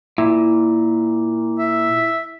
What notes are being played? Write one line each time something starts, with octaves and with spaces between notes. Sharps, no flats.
A#2 E4
E5